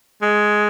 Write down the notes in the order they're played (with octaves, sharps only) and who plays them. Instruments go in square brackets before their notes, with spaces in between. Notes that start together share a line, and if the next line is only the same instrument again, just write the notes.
[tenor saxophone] G#3